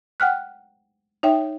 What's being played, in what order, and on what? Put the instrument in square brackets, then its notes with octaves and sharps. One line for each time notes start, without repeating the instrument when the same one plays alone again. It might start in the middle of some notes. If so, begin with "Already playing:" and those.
[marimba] F#5 G5 F6 F#6
D#4 C#5 E5 G5